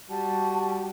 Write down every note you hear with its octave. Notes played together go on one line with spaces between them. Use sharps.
G3 F#4 A5